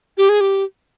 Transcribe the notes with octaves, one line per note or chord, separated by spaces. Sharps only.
G4
G#4
G4